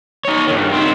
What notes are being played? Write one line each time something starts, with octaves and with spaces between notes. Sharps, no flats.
D#4 C#5
G2 D#3
D#3 C4